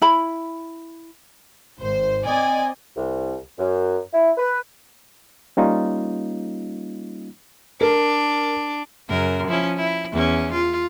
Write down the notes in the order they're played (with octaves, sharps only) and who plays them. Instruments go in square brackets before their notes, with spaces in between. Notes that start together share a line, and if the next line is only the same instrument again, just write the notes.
[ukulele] E4 B5
[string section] G#1 C5
C4 D5 D#5 G#5
[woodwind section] C2
F#2
E4
B4
[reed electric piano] G3 A#3 C#4 D#4 F4
[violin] D4 [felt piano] A#4
[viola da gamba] F#2 C#3 A#4
F3 C#4 E4
E4
E2 C#4
F4